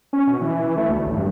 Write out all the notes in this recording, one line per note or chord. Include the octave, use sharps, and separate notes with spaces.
C#4
B2
E3
E3
A3
D2
A1
G2